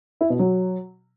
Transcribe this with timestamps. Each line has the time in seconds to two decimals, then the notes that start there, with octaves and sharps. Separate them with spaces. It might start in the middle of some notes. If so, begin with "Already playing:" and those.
0.21 E4
0.30 B2
0.39 F#3